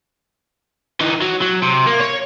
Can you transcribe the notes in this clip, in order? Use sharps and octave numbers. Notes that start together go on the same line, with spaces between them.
E3 D#4
F#3
F#3
C3
A#3
C#5